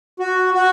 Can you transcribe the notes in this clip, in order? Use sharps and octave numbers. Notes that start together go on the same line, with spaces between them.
F#4
F#4